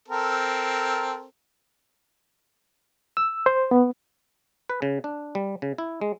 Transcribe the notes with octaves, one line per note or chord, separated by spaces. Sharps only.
C4 A4 A#4
E6
C5
B3
B4
C#3
D4
G3
C#3
E4
G#3